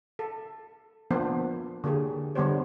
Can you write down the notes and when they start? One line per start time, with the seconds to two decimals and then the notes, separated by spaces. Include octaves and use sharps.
0.19 A4
1.11 F3 A#3 B3 D4 B4 C5
1.84 D3 A#3 G4 G#4
2.35 D3 G3 B3 G4 C5 C#5